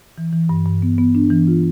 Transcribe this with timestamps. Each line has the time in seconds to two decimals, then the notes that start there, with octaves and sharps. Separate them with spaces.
0.18 E3
0.33 E3
0.49 G2
0.65 G2
0.82 B3
0.98 B3
1.15 D4
1.30 E3
1.47 F4